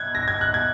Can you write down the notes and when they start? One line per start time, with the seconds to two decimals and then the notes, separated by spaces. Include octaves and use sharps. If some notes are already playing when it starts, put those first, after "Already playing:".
Already playing: F#6 G#6
0.15 A#6
0.28 G#6
0.41 F#6
0.54 G#6